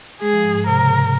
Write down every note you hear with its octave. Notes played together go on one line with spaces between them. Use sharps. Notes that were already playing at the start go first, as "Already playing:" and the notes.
G#3 G#4
F3
G#2
G#2
C3 A#4
C#3
G#2
C3